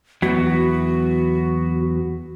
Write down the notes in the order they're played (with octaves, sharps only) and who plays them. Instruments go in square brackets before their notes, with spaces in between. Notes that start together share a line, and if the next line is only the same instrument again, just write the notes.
[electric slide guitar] E2 F#3 B3 [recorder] F#4